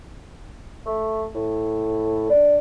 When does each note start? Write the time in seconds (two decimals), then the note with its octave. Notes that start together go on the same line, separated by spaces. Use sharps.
0.86 A3
1.35 A2
2.30 D4